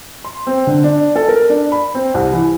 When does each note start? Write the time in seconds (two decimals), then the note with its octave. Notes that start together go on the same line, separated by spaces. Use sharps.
0.25 C6
0.47 C4
0.67 D3
0.84 D4
1.16 A4
1.29 A#4
1.50 D4
1.72 B5
1.95 C4
2.14 C2
2.33 E3